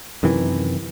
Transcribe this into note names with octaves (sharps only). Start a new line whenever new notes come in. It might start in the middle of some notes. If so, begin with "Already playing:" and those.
F#2 C3 D#3 E3